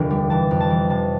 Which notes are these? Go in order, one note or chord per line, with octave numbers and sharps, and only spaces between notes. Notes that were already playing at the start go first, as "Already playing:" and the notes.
Already playing: F1 D#2 D3
G3
E3 A5
F2
A5
E3
C3 A5